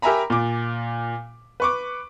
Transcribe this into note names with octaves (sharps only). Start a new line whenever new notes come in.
G4 A#4 E5 G#5 A#5 B5
A#2 D6
B4 C#6 D6